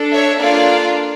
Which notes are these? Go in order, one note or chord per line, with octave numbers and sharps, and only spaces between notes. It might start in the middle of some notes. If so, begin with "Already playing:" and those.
Already playing: D4 A4
C#5 E5
A#3 D4 F4 A4 D5 F5